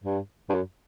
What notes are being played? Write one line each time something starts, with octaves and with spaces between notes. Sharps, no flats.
G2
G2
F#2